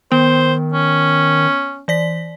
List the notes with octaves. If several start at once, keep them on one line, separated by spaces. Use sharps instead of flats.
D#3 B3 C5
C#4
E3 D5 B6